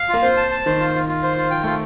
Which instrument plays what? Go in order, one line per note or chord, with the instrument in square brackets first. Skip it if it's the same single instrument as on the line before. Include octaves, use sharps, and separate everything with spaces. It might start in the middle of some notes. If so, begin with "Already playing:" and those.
Already playing: [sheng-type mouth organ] F5
[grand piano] A#3 [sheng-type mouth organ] F4
[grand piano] C4 [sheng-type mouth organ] C5
[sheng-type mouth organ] A5
A5
[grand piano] D#3 [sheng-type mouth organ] C5
[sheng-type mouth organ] F4
F4
F4
C5
F4
[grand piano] F3 [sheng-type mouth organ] G5
[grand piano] A3 [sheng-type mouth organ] F4